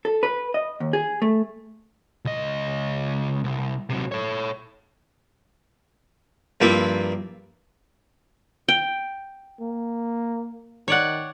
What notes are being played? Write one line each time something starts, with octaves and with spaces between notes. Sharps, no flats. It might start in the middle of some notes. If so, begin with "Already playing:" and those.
A4
B4
D#5
D#2
G#4
A3
C#2 D#5
C2
C3 F#3
A4 C#5
G2 F3 A#3 C4 E4
G5
A#3
D#3 C#5 D5 F#5